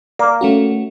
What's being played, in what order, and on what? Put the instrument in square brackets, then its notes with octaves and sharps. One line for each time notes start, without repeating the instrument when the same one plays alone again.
[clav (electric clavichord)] A#3 [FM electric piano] D5
[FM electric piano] A3 C#4 F#4